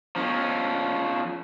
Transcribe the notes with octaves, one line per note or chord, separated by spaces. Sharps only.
F3 C#4